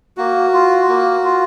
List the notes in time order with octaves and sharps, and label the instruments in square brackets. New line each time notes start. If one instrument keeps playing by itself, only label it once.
[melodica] A#3 F#4
F4
A#3
F4